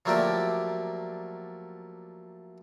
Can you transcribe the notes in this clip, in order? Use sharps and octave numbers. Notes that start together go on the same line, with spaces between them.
F3 F#3 A3 A#3 G4 D5